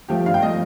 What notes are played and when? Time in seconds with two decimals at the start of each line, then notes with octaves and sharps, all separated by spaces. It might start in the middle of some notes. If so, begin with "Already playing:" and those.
0.08 F3 A3 G4
0.26 G2 F5
0.34 G5
0.42 F3 A3 D#5